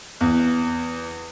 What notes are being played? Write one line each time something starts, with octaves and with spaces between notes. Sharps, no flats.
E2